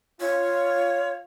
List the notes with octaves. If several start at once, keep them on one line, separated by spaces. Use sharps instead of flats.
F4 C#5